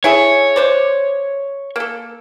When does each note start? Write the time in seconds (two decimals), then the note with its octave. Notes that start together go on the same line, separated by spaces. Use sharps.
0.04 E4 G#4 A4 C#5
0.56 D4 C5 D5
1.76 A#3 A4